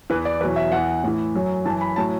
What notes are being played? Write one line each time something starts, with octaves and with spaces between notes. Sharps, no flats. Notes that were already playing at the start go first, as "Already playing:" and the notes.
E2 E3 B4
D5
E2 B2 F#3 B4
E5
E2 E3 F#5
A2 E3
F#2 F#3
F#2 E3 A5
B5
A2 F#3 A5